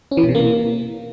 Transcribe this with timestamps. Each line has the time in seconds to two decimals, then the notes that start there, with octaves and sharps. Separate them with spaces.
0.11 C#4
0.17 E3
0.23 B2
0.29 C3
0.35 A#3